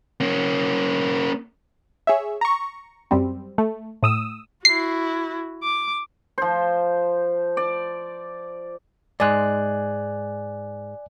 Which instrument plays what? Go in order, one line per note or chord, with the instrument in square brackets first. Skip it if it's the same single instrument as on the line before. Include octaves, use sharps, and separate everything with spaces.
[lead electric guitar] A#3 C#4
[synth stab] G#4 C#5 E5
A#5 C#6
F#2 G3 C4
A3
A2 D#6 E6
[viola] E4 F#4 [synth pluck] C7
[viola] D6
[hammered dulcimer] F3 C5
D5
[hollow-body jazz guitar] G#2 G#3 [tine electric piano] D5 G#5 F#6